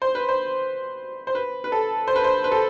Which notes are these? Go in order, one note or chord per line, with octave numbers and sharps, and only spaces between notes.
C5
B4
C5
C5
B4
B4
A4
C5
B4
C5
B4
A4